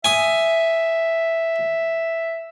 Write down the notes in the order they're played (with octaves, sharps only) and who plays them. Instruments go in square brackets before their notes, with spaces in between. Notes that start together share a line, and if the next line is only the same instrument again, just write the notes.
[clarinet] E5 [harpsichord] G#5 D#6